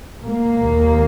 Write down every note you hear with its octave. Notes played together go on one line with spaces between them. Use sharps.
A#3
D#2